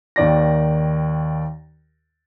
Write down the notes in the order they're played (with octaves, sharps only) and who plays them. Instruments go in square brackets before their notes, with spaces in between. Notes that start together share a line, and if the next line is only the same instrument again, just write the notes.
[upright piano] D#2 D#3 D5 A#6